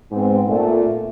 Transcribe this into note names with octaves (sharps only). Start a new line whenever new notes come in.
G#2 B3 C4
A#2 A3